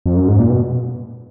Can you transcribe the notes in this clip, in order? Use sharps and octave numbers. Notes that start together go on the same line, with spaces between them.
F2
F#2
G#2
A#2
B2